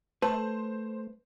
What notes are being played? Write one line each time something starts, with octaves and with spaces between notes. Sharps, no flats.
A3 B4 C5 A5